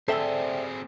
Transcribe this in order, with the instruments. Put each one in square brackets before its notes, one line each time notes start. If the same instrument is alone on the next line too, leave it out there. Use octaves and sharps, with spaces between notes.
[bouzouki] D3 G3 [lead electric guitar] C4 G#4 [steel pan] A4 [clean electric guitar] C5 E5 G5